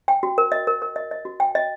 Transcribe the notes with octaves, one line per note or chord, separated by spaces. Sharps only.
G5
F#4
A#4
D#5
A#4
A#4
D#5
D#5
F#4
G5
D#5